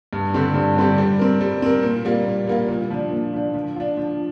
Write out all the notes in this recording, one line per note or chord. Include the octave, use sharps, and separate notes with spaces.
G2
D3 G3 C4 G4
G2
D3 G3 C4 G4
G3
C4 A#4
G3
C4 A#4
A#2
G3 A#3 F4
A#2
G3 A#3 F4
A#2
F3 D4
A#2
F3 D4
F3
D4 F4
F3